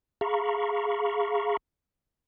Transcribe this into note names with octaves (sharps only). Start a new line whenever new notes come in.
G#4 F5 A#5 B5 C#6